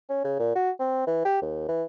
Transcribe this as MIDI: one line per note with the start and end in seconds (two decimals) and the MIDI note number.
0.09 0.21 61
0.24 0.38 49
0.39 0.51 46
0.56 0.71 66
0.80 1.05 60
1.07 1.22 52
1.25 1.40 67
1.42 1.68 39
1.68 1.84 52